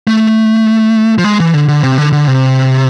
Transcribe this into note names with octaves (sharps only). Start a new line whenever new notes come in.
A3
F3
G#3
E3
D3
D3
C3
D3
D3
C3